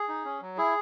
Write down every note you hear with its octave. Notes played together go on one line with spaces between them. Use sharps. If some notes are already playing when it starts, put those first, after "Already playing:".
Already playing: G#4
D#4
C#4
F#3
E4 G#4